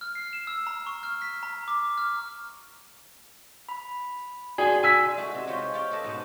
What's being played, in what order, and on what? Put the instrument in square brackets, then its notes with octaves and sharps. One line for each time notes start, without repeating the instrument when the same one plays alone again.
[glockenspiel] F6
C7
E7
E6
A#5
C#6
F6
B6
A#5
D6
F6
[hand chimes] B5
[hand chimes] F#4 D5 [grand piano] G#4 G#5
[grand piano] G#5 E6 B6
[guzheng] D#4 E4 F#4 G#4 A4
C3
G#3 D#4 F4 G4 C5 C#5
G4 C#5 D5 F5 G5
A4 B4 D#5 A5
G#2 B2 D#4 F#5